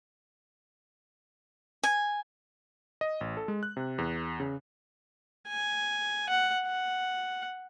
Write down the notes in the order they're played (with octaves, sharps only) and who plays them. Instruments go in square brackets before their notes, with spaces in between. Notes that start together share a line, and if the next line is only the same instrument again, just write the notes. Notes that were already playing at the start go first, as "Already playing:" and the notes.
[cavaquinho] G#5
[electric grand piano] D#5
A1
A4
G#3
F#6
C3
E2
C#3
[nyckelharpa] G#5
F#5
F#5